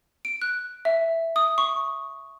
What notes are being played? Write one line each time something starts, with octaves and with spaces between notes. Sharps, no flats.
D7
F#6
E5
D#6
C#6